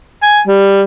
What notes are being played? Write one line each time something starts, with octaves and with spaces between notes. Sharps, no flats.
G#5
G3